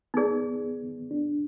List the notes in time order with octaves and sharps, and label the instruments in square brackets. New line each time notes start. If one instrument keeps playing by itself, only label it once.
[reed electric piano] B3 [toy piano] D#4 G#4 D5
[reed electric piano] D4